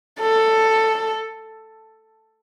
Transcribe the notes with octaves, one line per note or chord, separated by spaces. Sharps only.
A4